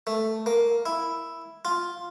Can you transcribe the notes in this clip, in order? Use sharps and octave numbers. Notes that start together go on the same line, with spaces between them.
A3
A#3
E4
F4